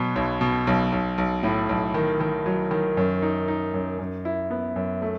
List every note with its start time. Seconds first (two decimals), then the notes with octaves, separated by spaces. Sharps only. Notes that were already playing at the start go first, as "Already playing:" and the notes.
Already playing: B2 F#3
0.16 B1
0.41 B2
0.67 B1
0.92 B1
1.18 B1
1.43 A2
1.69 B1
1.94 D#3
2.20 D#3
2.46 F#3
2.71 D#3
2.97 F#2
3.22 D#4
3.48 D#4
3.74 F#2
3.99 F#2
4.25 E4
4.51 B3
4.76 F#2
5.02 A3